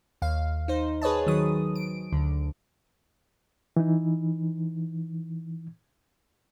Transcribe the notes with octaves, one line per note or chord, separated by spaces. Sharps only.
D#2 F5
D#4 C5
G#4 B4 C#5 D#5 A5
D#3 F#3 D#6
D7
D2 D3
E3 D#4